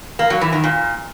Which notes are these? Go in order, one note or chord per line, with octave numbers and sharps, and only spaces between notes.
A#3
F#3
E3
D#3
A#2